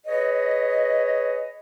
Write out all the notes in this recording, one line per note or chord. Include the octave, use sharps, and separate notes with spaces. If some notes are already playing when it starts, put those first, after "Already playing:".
G#4 B4 C#5 D#5